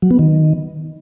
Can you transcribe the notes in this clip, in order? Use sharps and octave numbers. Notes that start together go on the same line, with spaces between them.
F#3
B3
D#3